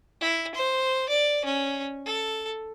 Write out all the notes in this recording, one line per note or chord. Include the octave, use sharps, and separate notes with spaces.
E4
C5
D5
C#4
A4